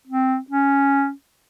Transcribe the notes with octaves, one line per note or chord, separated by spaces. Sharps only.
C4
C#4